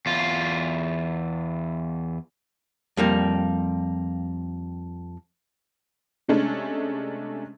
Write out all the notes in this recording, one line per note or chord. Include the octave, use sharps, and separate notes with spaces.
E2 F4
F2 G3 A#3
C3 G#3 A3 C#4 D4